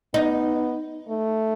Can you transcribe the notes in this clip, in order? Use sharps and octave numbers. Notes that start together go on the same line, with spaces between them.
B3 D#4
A3